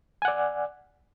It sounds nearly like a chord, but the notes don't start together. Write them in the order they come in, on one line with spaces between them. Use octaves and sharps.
G#5 F#5 D5